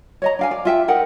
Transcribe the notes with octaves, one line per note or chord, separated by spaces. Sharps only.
C#5 D#5 A#5
D4 F5 G#5
D5
F4 E5 G5
D#4 A#4 F#5 G5